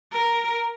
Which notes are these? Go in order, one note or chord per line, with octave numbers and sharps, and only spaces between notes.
A#4